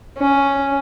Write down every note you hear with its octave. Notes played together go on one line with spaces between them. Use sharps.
C#4